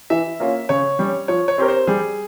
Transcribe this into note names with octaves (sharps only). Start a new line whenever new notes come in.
E3 E5
A#3 C#4 F4
C#3 C#5
G3 C#4
F3 C#5
C#5
C4 G4 A#4
C5
G3 G#4